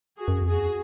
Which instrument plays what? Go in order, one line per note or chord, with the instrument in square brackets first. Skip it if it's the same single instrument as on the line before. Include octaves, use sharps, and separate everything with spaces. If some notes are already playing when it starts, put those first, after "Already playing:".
[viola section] F#4 G#4
[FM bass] F#2
F2
[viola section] F#4 G#4
[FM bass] E2